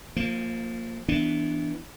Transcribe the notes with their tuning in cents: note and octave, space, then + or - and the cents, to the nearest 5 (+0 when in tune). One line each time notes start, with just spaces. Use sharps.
F3 +15 A#3 -20
E3 +0 B3 +0 D4 +5